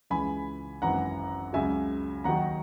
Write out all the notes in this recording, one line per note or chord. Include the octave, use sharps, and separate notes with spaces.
C#2 C#3 E3 G#5 B5
G#1 F#2 E3 F#5 A#5
C#2 C#3 F#3 E5 G#5
D#2 D#3 F#3 F#5 A#5